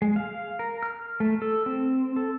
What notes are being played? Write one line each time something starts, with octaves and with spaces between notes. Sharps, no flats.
G#3
F5
A#4
F6
A3
A4
C4
A4